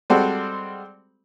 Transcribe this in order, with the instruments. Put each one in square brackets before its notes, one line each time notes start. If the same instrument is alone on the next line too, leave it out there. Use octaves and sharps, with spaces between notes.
[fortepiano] G3 G#3 C4 F#4 A4